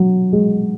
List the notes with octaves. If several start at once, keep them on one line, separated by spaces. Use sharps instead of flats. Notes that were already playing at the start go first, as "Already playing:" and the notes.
Already playing: F#3
G#3